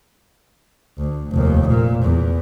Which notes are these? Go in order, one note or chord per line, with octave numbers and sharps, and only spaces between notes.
D2
F1 D#2
A#2
E2